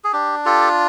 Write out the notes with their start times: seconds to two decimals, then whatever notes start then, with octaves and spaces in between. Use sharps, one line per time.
0.04 G#4
0.13 D4 G4
0.45 F4 G4 A4